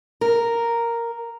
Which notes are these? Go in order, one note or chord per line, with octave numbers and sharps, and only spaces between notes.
A#4